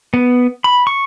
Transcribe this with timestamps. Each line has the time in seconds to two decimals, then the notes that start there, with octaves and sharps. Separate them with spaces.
0.14 B3
0.64 B5
0.87 C#6